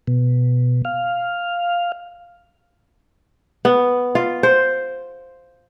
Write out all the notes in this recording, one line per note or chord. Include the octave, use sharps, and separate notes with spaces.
B2
F5
B3
F4
C5